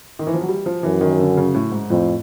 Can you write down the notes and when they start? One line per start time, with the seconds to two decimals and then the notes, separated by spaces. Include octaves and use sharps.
0.19 D#3
0.27 E3
0.34 F3
0.41 F#3
0.49 G3
0.66 F3
0.83 F#2 E3
1.01 D#3
1.19 D3
1.37 C#3
1.54 A2
1.71 G#2
1.90 F2 A2